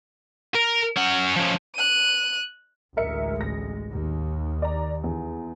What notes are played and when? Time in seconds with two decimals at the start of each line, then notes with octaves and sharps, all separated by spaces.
0.55 A#4
0.96 C#4 F#5
1.36 F3 C#4
1.75 F#6 D#7
2.97 A1 D2 G#3 A#4 E5 C#7
3.41 A#6
3.91 D#2
4.62 D5 A#5
5.04 E2